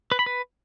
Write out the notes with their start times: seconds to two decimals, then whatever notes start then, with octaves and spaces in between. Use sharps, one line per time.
0.12 B4
0.19 B5
0.26 B4